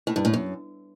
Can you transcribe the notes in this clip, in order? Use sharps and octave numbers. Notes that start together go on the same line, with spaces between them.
A2
G2
A2
F#2